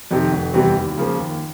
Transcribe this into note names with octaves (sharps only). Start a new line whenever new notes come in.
F2 C3 D#3
F1
E2 C3 E3 G3
D#2
C#3 F3 A#3
D#2